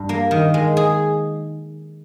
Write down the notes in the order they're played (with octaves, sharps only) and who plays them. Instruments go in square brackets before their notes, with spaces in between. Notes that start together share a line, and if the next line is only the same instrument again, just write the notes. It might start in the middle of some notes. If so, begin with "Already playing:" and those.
Already playing: [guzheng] G2 G3
A#3
D#3
G#3
G#4